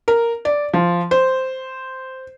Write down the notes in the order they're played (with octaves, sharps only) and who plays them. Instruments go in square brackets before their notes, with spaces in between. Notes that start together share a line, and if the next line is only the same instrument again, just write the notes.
[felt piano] A#4
D5
F3
C5